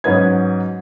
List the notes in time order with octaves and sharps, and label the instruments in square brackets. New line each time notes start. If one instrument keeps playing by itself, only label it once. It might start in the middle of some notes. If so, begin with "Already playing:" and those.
[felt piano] G#2 F#3 C#4 B4 D#5 G#6